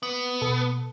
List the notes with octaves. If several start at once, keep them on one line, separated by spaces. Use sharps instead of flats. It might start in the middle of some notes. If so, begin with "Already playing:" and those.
B3
B2 A4